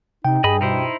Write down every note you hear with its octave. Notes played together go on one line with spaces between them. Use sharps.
C3 D#4 G5
G2 G#4 D#5 B5
B2 D#4 E4 C5